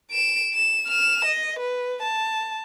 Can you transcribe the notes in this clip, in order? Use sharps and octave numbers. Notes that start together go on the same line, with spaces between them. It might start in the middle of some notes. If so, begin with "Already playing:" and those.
D7 E7
E7
F6 E7
D#5
B4
A5